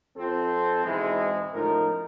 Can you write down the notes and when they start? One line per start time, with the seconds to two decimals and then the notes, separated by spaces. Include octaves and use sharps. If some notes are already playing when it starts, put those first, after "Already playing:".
0.16 F2 C4 F4 A4
0.84 G#2 B2 E3 G#3 C4 E4
1.53 C#2 A2 F3 D#4 A#4